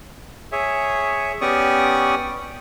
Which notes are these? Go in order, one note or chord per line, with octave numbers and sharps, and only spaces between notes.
G#4 C#5 E5
B3 C#4 G4 D5 C#6 D#6